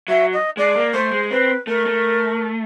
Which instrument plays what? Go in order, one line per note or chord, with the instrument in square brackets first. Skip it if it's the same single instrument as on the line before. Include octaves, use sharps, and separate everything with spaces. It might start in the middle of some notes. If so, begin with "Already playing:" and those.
[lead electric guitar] F#3 [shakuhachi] E5
[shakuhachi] D#5
[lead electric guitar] G#3 [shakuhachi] D5
[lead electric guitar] A#3
[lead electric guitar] A3 [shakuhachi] C5
[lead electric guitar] G#3
[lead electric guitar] C4 [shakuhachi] B4
[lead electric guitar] A3 [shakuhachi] A#4
[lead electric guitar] A3